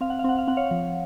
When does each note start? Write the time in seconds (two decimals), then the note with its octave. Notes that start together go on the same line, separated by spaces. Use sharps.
0.01 C4 F5
0.10 F#5
0.19 F5
0.24 C4 F#5
0.38 F5
0.47 C4 F#5
0.57 C#5 F5
0.71 F3